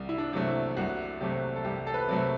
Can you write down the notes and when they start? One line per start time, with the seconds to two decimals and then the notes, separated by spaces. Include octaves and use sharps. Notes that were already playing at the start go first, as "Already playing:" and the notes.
Already playing: C2
0.09 E4
0.18 D4
0.33 C3 F#3 A3
0.47 E4
0.77 C2 F#4
1.21 C3 F#3 A3 G4
1.56 A4
1.64 C2 G4
1.87 A4
1.94 B4
2.08 C3 F#3 A3 A4